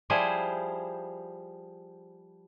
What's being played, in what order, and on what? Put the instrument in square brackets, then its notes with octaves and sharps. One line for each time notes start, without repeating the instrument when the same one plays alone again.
[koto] F3 G3 E4 G#4 C5